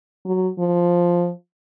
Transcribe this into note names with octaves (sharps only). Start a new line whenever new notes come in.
F#3
F3